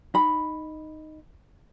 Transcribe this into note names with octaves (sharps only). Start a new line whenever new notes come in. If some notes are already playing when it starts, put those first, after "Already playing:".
D#4 B5